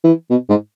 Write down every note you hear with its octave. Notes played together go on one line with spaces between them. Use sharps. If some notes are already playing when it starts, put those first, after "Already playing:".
E3
B2
G#2